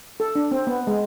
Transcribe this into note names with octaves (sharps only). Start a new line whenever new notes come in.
A4
D4
C4
B3
G#3